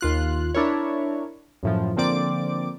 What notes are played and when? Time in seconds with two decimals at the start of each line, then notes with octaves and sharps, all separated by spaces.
0.01 D#2 F4 F#6
0.55 D4 E4 A#4 C#5
1.63 F#2 A2 F3
1.96 D3 F3 A#3 C4 D5 D6